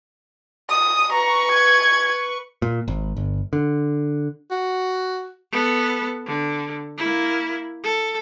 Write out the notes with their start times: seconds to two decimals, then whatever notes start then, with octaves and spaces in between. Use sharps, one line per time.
0.70 D#6
1.12 B4 A#5 C#6
1.52 G#6
2.62 A#2
2.88 G#1
3.17 G1
3.53 D3
4.51 F#4
5.52 B3 A4
6.26 D3
6.97 A#3 E4
7.83 A4